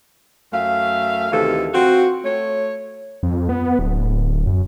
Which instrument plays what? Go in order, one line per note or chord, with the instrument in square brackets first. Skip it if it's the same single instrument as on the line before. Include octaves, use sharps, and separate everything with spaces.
[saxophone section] F#2 A3 E5 F5
D2 C3 D#3 E3 A4
C4 F4 F#4
A3 C#5
[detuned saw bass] F2
B3
D1
F#2